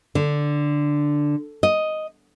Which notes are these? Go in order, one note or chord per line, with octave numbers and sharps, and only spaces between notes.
D3
D#5